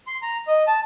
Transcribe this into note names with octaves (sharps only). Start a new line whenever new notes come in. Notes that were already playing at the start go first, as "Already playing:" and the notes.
C6
A#5
D#5
A5